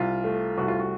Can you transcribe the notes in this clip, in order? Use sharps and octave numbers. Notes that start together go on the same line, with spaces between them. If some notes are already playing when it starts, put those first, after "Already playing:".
Already playing: C2 F4
A3
C2 F#4
F4
F#4